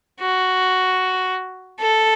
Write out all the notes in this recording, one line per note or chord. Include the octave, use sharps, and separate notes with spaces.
F#4
A4